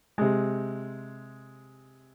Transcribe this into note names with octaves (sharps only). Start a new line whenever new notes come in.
C3 G#3